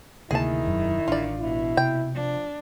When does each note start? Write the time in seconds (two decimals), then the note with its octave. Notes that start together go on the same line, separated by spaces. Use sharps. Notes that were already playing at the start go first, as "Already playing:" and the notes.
0.31 D2 C3 D#3 A#3 E4 G#4 A5
0.65 E1 F#2 F#3
1.08 A1 D4 F4 D5
1.41 B2 E4
1.77 C3 G5
2.15 F3 D4